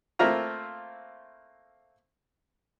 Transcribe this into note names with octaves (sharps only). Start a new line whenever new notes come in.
A3 A#3 C4 E4 F4 A#5